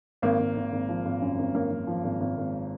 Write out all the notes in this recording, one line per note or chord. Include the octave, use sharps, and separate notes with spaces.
G#1 A#3
G#1
G#1
G#1
F3
G#1
F#2
G#1
F#2 A#3
F#2
F3
G#1
G#1
G#1